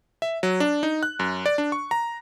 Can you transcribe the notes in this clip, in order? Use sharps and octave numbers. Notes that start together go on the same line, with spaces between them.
E5
F#3
D4
D#4
F#6
F#2
D5
D4
C#6
A#5